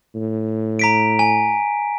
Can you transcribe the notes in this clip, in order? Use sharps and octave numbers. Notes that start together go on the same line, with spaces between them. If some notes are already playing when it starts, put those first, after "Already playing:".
A2
A#5 B6 D7
G#5